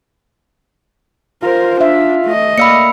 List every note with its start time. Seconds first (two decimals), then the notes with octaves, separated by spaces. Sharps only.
1.43 F4 A#4 C5
1.81 D4 E5
2.26 A3 D#5
2.58 A#3 D5 F5 B5 E6 C#7